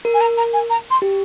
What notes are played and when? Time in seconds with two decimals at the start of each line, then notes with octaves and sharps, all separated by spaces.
0.05 A#4
0.14 G#5
0.21 A#5
0.37 A#5
0.53 G#5
0.70 A#5
0.91 C6
1.02 G4